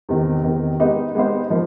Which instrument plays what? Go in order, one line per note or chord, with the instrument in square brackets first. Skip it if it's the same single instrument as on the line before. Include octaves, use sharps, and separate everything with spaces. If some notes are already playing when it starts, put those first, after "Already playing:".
[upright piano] E2 C3 D#3
E2 C3 D#3
G#3 B3 D#4 G4 C5
G#3 B3 D#4 G4 C5
F3 A#3 D#4